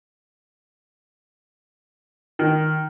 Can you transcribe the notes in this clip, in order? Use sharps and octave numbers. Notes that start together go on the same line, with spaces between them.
D#3